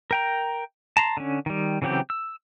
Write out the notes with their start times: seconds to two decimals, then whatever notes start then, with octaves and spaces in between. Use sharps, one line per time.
0.11 A#4 G5 A#5
0.97 A5 A#5 C6
1.17 D3 C#4
1.46 D#3 G3
1.82 C#3 E3 F#3 C4 G4
2.10 E6